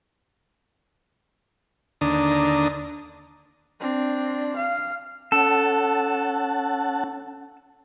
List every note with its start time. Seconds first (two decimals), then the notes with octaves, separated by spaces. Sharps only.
2.01 D#2 D3 D4 A#5 D#6
3.80 C4 D4
4.57 F5
5.32 C#4 A4 F#5 A5